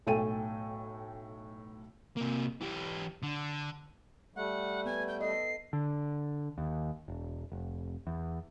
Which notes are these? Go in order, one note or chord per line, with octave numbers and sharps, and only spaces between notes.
B1 A2 A4 G5 G#5 D#7
C3 A#3
E3 G4
D3
G3 A3 F#5
B3 G#5
G6
A4 D#5 C7
D3
D#2
E1
F1
E2